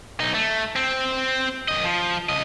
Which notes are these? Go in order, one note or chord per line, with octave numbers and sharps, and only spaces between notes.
B1 D#4
A3
C4
F#2 D#5
F3
C#3 D#5